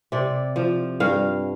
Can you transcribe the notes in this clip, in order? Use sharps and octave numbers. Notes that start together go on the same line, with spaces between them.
C3 D5
F3
G2 F5